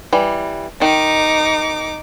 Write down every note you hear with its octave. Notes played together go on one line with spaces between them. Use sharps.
E3 G3
D#3 D#4 D6